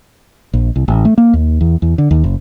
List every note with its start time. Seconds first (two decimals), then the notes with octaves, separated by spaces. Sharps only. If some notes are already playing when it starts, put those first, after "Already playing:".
0.53 A#1
0.76 C2
0.88 A1
1.05 A3
1.18 A#3
1.33 D#2
1.61 E2
1.82 E2
1.98 D3
2.11 D#2
2.24 F#1